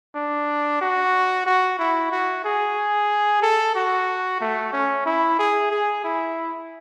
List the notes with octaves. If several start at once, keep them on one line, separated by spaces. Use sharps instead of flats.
D4
F#4
F#4
E4
F#4
G#4
A4
F#4
A3
C#4
E4
G#4
G#4
E4